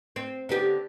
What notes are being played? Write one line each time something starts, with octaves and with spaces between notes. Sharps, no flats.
C4
D3 B3 G4